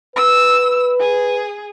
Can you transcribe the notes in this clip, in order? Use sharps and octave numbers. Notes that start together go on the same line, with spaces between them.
B4 E6
G#4